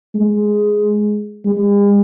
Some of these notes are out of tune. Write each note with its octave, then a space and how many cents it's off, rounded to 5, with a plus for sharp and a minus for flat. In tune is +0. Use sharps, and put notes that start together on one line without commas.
G#3 +5
G#3 -45